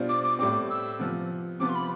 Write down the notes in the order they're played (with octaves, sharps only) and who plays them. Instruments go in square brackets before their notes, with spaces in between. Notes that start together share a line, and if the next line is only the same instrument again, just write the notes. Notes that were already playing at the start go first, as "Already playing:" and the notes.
Already playing: [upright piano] B2 G3 D4 F4 C5
[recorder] D6
D6
[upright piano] A2 G3 C4 [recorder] D6
[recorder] E6
[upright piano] C3 F3 B3
[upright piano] C3 F3 B3 F4 [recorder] D6
[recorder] C6
B5